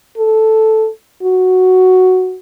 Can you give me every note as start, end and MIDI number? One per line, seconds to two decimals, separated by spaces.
0.18 0.88 69
1.23 2.38 66